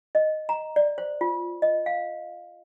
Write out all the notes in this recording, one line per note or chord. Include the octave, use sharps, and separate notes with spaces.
D#5
A#5
D5
C5
F4
D#5
F5